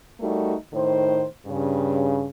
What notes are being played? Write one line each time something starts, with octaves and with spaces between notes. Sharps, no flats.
G3 A3 D#4 F#4 A#4
A2 D#3 C5
G2 C#3